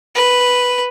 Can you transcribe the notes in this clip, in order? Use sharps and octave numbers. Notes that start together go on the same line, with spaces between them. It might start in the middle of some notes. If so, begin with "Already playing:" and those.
B4